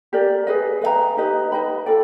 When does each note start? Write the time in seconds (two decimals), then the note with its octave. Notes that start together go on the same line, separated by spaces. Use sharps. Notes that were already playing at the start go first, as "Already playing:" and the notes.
0.13 G4 A#4 D5
0.47 G#4 B4 D#5
0.81 B4 E5 G5 A#5
1.17 D#4 G4 B4 D#5
1.52 B4 D#5 G5 B5
1.86 F4 A4 D5 G5